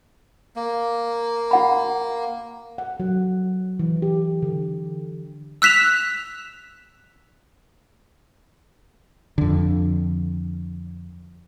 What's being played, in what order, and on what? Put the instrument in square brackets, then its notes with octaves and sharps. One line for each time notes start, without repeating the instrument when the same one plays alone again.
[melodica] A#3
[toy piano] F#4 F#5 B5
[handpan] F#5
F#3
E3
G4
D3
[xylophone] E6 F#6 B6 E7 F7
[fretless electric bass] F2 D3